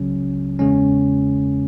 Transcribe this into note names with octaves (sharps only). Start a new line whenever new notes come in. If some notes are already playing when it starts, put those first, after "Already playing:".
Already playing: C#2 C#3 F#3 C#4
E2 C#3 G#3 C#4